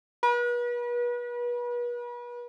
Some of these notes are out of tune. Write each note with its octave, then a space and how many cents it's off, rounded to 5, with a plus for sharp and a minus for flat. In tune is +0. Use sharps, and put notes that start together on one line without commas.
B4 -40